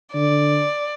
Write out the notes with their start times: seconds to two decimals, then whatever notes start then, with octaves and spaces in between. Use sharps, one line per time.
0.14 D3 D5